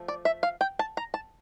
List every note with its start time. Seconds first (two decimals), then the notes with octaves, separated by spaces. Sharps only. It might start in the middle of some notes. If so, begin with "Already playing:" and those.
Already playing: F3 A3
0.08 D5
0.25 E5
0.43 F5
0.61 G5
0.79 A5
0.97 A#5
1.14 A5